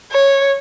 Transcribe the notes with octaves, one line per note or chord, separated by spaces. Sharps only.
C#5